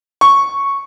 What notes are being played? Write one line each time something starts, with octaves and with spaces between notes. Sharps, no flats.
C#6